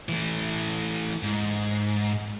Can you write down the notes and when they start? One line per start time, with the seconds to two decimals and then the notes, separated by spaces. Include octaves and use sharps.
0.09 E3 A3
1.23 G#2